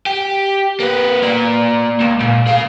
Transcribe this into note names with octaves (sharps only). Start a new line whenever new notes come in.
G4
A#3 B4
A#3 D5
C#2
A#2
G#4 F5